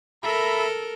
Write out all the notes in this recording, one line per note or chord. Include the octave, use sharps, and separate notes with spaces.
A4 A#4 E5 A#5 B5